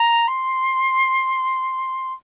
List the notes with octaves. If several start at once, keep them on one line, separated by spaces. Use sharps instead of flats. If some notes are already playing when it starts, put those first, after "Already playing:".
Already playing: A#5
C6